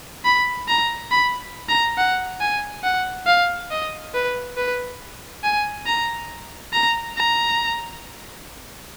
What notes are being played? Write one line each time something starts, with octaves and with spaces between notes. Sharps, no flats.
B5
A#5
B5
A#5
F#5
G#5
F#5
F5
D#5
B4
B4
G#5
A#5
A#5
A#5